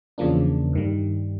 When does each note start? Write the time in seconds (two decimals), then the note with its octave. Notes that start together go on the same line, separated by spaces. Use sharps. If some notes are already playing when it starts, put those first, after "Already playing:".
0.18 E2 C#3 F3 A#3 D4
0.73 G2 D#3 G3